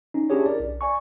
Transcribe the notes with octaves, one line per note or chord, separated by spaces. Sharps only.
C#4 D#4
C#4 D4 E4 G4 G#4 C#5
A#4 D5
B1
D5 G#5 C#6